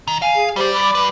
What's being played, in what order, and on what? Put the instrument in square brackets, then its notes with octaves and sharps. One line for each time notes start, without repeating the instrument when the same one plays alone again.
[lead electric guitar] D#3
[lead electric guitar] F5 [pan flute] G#5
[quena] G#4
[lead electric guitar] G3 D5 [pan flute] G4 [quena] C5
[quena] B5 [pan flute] D6
[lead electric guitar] G3 B4